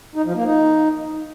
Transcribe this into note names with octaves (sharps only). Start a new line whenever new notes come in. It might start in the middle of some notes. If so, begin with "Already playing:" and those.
D#4
F3
A#3
D#4